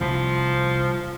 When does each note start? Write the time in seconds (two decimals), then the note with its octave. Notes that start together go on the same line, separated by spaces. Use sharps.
0.01 C2 C3 F3